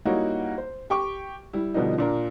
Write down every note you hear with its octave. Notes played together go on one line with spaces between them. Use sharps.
G3 A#3 D#4 E4 F#4 C#5
C5
G4 G5 C#6 D6
G3 E4
B2 D3 F3 G3 D4 D#4
A#2 D4 A#4